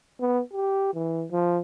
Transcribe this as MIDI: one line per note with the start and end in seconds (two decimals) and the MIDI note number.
0.20 0.41 59
0.53 0.93 67
0.94 1.25 52
1.31 1.60 53